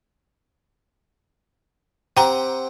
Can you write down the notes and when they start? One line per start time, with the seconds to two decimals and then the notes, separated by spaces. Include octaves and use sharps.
2.17 C4 G4 F#5 G5 A#5